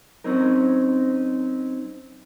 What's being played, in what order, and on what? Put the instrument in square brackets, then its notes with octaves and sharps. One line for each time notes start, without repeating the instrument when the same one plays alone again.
[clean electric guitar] F#3 C4 C#4 D#4 A#4